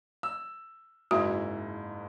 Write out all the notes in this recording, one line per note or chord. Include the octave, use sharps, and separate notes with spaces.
E6
F#1 G#2 E4 F#4